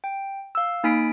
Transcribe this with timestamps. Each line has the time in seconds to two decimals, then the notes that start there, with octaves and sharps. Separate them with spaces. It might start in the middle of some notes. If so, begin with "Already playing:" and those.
0.04 G5
0.55 F5 E6
0.84 A#3 D#4 G#5 B5 B6 D7